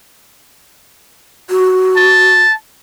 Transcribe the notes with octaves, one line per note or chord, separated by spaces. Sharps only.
F#4
A5